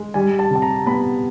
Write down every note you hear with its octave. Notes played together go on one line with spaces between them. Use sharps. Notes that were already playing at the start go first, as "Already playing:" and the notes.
Already playing: G#3
G3 G#5
A5
C3 A5
A#5
B3 B5